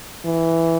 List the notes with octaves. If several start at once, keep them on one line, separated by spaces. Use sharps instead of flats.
E3